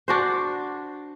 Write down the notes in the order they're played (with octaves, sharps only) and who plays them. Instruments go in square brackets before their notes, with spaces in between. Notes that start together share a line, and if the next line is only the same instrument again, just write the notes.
[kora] D4 F#4 C5